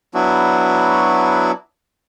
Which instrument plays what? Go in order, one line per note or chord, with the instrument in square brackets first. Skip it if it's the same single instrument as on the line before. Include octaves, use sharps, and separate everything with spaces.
[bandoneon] F#3 B3 D4 E4 F#4